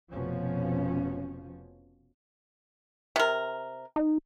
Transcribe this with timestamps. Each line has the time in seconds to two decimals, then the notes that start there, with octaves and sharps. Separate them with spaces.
0.11 F1 B2 F3 C#4
3.16 C3 A#4
3.96 D#4